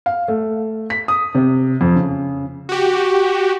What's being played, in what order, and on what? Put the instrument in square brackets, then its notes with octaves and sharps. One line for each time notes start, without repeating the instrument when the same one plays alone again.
[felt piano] F5
A3
B6
D#6
C3
F2
C#3
[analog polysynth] F#4 G4